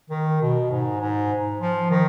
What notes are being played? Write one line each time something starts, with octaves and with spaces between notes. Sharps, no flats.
D#3
B2
G#2
G#2
F3
D#3